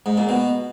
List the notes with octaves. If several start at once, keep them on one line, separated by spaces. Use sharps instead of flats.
G#2
A#2
B2